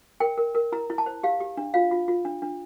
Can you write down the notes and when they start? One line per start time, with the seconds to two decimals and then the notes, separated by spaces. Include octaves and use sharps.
0.20 A#4 G5
0.38 A#4
0.55 A#4
0.72 E4 A#5
0.90 E4
0.98 A5
1.06 C5
1.23 G4 F5
1.40 G4
1.57 D4
1.74 F4 F5
1.91 F4
2.08 F4
2.25 D4
2.42 D4